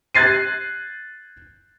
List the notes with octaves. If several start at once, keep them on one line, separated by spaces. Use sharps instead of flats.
F#6 G#6 A6 C7 D#7